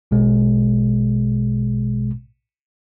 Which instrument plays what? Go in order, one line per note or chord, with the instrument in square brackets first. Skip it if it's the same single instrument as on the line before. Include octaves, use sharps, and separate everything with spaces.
[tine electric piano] A#1 B2 G#3